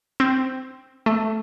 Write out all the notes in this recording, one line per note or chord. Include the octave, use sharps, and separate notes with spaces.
C4
A3